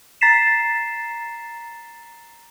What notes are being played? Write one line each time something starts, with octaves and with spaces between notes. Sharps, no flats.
A#5 A6 B6 C7 E7